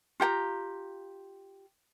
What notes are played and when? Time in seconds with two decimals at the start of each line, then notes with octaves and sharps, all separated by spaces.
0.20 F4 G4 F#5 A#5